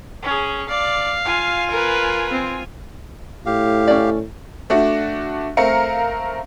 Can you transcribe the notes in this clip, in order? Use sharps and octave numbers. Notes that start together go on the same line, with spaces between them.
C#4 G#4
D5 F5
F4 G#5
A#4 B4
C4
A2 G4 F5
C#4 D5
A3 D4 F#4
A3 C4 A#4 F5 C#7